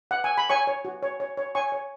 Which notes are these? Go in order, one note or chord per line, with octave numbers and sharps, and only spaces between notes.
F#5
G#5
B5
C#5 G#5 C#6
C#5
F#4
C#5
C#5
C#5
C#5 G#5 C#6
C#5